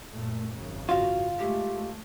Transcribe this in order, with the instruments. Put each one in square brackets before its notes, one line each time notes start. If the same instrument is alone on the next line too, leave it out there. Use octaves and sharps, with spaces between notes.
[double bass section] F#2 A#2 A3
G#1 F#2 C#3
[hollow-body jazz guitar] F4 [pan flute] F#4
[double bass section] G#3 A3 [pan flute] G4